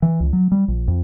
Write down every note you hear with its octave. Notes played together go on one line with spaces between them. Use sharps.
E3
C#2
F#3
G3
A#1
F2